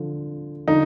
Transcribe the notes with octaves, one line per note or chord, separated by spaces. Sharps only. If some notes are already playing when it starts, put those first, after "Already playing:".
Already playing: D3 F3
D3 F3 D#4